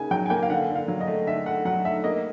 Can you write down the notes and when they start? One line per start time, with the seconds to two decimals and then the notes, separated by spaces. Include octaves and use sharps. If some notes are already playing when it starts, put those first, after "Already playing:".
Already playing: C#3 A#3 D#4 G#5
0.11 F#3 G5
0.26 G#5
0.30 A#3 G5
0.43 F5
0.50 D3 F#5
0.69 D3
0.75 F5
0.88 F#3
1.01 D#5
1.08 A3
1.27 D3 E5
1.46 D3 F#5
1.65 F#3 F#5
1.85 A3 E5
2.04 A#3 D#5